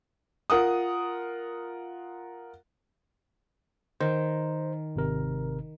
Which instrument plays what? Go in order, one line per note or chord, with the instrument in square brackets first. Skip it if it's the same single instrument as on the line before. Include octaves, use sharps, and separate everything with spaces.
[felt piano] F4 A#4 F#5 D#6
[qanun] D#3 [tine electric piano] C5
[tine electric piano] G#1 C3 A#4